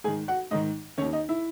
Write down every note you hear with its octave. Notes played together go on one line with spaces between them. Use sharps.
G#2 D#3 G#4 G#5
F#4 F#5
G#2 D#3 D#4 D#5
D#2 D#3 C#4 C#5
D#4 D#5
E4 E5